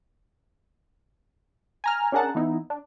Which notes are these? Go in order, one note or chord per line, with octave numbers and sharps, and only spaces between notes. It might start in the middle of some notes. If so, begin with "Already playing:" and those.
G#5 A#5 F6
C#4 D4 G#4 A#4 F#5 A5
E3 B3 D#4 E4
D4